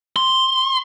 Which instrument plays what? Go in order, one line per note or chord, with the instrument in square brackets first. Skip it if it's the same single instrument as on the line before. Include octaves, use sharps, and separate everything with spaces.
[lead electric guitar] C6